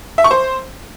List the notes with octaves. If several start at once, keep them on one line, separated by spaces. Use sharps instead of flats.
E5
C#6
C5